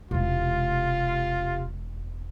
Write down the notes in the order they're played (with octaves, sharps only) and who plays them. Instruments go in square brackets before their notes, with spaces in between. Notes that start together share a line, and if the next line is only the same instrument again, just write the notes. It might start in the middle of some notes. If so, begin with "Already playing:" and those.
[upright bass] E1 G#3 [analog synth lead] C3 [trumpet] F4